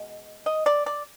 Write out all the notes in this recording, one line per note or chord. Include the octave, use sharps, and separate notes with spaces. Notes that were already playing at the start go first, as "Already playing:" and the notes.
Already playing: B2 G#3
D#5
D5
D5